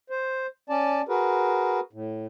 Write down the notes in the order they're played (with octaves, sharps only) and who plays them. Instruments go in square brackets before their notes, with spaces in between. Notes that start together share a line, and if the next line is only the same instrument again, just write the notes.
[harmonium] C5
C#4 D5 A5
F#4 G#4 A#4 B4
A2